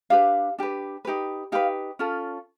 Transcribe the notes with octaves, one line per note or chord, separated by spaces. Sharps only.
D4 G4 B4 F5
D4 G4 B4
D#4 G4 B4
D#4 G4 B4 F5
C#4 F4 A4